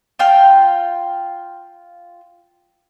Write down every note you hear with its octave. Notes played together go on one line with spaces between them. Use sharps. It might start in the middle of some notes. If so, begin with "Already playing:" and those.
F4 F5 G5